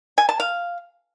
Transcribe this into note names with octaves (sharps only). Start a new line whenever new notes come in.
G#5
A5
F5